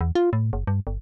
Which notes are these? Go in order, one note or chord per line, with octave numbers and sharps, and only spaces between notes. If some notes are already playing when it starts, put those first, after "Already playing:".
E2
F4
A2
F#1
G2
G1